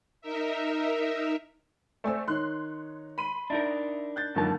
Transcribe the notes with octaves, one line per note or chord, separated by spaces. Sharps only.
D#4 A#4 E5
A3 C4 D5 G#5 E6
D#3 D#4 C#5 C6 F#6
B5 C6 D#7
D4 D#4 A#4 E5
F#6 G6 A6
C#2 F#2 D3 D#3 F3 A#3 A5